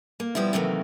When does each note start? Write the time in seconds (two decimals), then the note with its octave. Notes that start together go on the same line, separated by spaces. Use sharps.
0.20 A#3
0.35 B2 F3 G3 B3 E4
0.53 C3 D#3 E3 F#3 A3 A#3